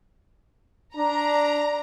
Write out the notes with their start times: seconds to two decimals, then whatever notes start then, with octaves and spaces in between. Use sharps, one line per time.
0.96 D4 A#5